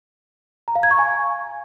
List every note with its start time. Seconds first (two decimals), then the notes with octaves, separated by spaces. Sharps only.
0.68 A#5
0.75 F5
0.83 G#6
0.91 C#6
0.99 G#5